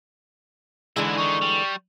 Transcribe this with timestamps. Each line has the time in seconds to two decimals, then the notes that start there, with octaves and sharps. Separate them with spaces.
0.96 G#2 D3 E3 G#3 E4
1.17 D#3 D#4 C#6
1.42 G3